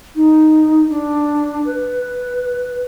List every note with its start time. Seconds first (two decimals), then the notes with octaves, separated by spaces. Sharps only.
0.16 D#4
0.90 D4
1.65 B4